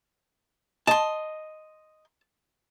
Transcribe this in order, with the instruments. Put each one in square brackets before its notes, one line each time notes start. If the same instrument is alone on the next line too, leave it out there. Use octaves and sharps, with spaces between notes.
[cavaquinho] D#5 C6 [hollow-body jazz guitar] A5